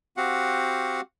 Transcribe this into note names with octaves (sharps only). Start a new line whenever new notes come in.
C4 F#4 G4 F5 F#5